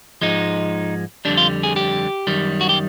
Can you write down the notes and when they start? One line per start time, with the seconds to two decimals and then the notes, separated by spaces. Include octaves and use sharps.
0.21 G#2 F3 G#3 D#4
1.25 F2 D3 G3 D4
1.37 F4
1.63 G#4
1.76 G4
2.27 F#2 D#3 G3
2.61 F#4
2.69 G4